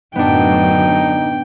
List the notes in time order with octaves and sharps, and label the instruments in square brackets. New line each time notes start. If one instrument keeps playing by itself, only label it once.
[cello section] F#2 A2 D3 [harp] B3 D4 [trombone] D#4 [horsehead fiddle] G5